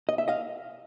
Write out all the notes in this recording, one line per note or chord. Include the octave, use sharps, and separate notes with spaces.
D#5
E5
D#5 F5